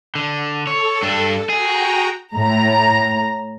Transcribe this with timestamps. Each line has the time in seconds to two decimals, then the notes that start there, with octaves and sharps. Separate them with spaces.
0.15 D3
0.67 A4 C#5
1.03 G2 D4
1.50 F#4 G#4 G5 A#5
2.34 A2 A#5